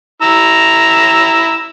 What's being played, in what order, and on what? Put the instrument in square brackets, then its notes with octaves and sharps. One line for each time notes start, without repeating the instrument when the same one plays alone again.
[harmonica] E4 A#5 E6